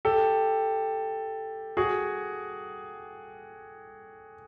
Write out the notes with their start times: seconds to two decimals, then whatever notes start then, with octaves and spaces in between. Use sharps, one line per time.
0.05 G4 A4
1.77 F#4 G#4